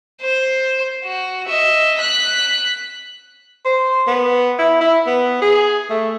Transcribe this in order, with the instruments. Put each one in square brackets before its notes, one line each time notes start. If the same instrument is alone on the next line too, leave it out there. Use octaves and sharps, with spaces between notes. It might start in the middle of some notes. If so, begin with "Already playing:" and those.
[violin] C5
F#4
D#5 E5
F#6 B6
[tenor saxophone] C5
B3
E4
E4
B3
G#4
A3